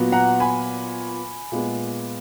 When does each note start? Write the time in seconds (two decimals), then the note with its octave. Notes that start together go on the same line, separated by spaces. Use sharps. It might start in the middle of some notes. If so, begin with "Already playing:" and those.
Already playing: A#2 F#3 B3
0.12 F#5 A#5
0.40 G#5 B5
1.52 A#2 G#3 B3